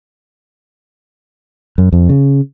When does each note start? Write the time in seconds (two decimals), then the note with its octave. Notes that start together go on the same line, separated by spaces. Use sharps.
1.78 F#2
1.93 F2
2.09 C#3